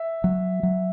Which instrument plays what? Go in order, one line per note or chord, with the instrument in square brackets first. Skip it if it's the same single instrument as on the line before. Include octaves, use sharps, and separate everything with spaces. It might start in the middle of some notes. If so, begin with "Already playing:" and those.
Already playing: [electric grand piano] E5
[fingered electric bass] F#3
F#3